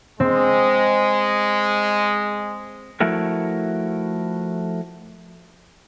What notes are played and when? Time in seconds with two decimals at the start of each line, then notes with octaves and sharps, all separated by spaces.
0.20 G#3 C4
3.00 F3 A3 E4 F#4 A#4